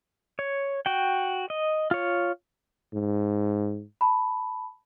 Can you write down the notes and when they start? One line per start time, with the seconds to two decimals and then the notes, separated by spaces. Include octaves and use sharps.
0.39 C#5
0.86 F#4 G5
1.50 D#5
1.91 F4 C#5
2.94 G#2
4.01 A5 B5